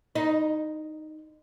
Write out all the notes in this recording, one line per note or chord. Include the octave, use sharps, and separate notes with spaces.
D#4